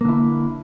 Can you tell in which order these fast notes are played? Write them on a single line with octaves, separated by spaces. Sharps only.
A#3 D3 E4